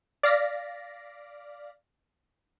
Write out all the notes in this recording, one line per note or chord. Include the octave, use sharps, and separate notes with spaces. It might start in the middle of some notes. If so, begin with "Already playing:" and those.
D5 F5 A#6 B6